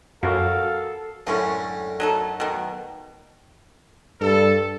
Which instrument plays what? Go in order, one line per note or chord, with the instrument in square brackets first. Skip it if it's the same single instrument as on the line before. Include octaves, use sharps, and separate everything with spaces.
[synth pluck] F#2 [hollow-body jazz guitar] F#4 A#4 [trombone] A4 [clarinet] F5
[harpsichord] F#2 A2 [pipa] D3 G#3 C#4
[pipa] F#3 D#4 A4
B2 D#3
[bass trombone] G2 [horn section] A4